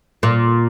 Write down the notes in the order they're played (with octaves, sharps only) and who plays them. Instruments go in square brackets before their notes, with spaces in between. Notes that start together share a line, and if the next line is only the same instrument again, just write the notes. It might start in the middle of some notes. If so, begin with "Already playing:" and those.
[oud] A#2